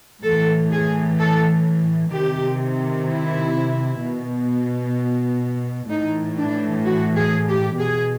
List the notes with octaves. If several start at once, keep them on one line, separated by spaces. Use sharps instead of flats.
A2 E3 A4
G#4
A4
C3 D#3 G4
E4
B2
A2 E3 D#4
D4
F#4
G#4
G4
B2 G#4